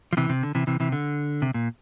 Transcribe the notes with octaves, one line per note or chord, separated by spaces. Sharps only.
F3
C3 E3
C3
D3
C3 E3
C3 E3
C3 E3
D3
C3
A#2